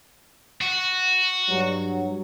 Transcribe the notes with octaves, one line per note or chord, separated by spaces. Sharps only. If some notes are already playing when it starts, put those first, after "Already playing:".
F#4
G2 F#3